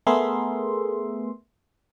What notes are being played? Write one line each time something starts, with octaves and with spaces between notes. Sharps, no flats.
A3 B3 G#4 A#4 E5 C6